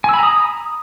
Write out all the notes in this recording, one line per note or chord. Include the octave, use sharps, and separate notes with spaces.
G#5 A#5 B5 D#6 E6